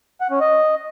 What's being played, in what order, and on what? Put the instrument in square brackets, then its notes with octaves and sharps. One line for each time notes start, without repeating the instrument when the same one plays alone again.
[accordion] F#5
C#4
D#5